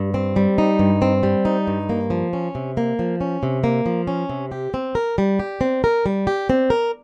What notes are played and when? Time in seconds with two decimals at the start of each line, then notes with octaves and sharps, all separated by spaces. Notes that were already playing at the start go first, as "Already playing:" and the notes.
Already playing: G2
0.14 C4
0.36 G3
0.58 D#4
0.79 G2
1.02 C4
1.23 G3
1.45 D#4
1.67 G2
1.89 A#3
2.10 F3
2.33 C#4
2.55 C3
2.77 A#3
2.99 F3
3.21 C#4
3.43 C3
3.64 A#3
3.86 F3
4.07 C#4
4.29 C3
4.52 G4
4.74 C4
4.95 A#4
5.18 G3
5.39 G4
5.61 C4
5.84 A#4
6.06 G3
6.27 G4
6.50 C4
6.70 A#4